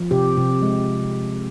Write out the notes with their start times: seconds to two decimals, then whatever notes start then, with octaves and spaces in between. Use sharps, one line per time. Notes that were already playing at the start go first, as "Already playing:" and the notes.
Already playing: F3
0.11 C3 G4
0.37 C3
0.62 G#3